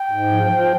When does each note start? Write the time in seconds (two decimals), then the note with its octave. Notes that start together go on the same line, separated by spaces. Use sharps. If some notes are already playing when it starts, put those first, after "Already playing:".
Already playing: G5
0.11 G#2
0.32 F3
0.51 F3